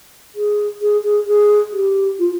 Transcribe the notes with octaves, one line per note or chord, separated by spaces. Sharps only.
G#4
G#4
G#4
G#4
G4
F4